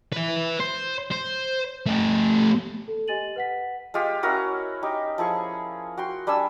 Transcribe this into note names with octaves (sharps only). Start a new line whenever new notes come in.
B4 E5
C5
C5
A3 G4
A4
G4 D#5 G#5 A6 D#7 F#7
B4 F#5 B6
G#3 F4 G4
C#4 E4 F#4 A#4
D#4 G4
F3 E4 G#4 C#6
F#4 G5 C6
G3 D4 G#5 E6